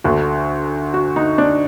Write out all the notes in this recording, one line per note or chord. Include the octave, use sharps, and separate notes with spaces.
D2 D3 F#4
F#4
D#4
D4